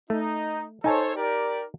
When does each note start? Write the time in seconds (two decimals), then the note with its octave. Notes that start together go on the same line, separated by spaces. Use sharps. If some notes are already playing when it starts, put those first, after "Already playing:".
0.10 A3 D#4
0.84 D#4 A4 C5 C#5 G#5 A5
1.16 G4 A#4 D5